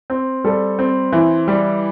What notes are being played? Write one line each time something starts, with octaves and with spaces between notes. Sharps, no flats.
C4
G3 A4
C4
E3
G3